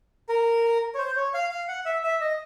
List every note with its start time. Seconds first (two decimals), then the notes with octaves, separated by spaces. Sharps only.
0.29 A#4
0.95 C#5
0.98 C5
1.16 C#5
1.34 F5
1.51 F5
1.68 F#5
1.86 E5
2.04 E5
2.21 D#5